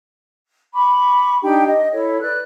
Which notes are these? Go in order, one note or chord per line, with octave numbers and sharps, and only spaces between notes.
B5 C#6 D6
D4 D#4 G4 G5
D#5
E4 A4 C#5
B4 D5 F#6